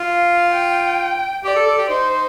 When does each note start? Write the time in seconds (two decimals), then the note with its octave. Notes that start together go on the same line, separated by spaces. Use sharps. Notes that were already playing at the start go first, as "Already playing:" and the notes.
Already playing: F4
0.09 F5
0.54 G5
1.44 G4 D5
1.56 A4
1.67 A4
1.78 G4
1.89 D#4 C5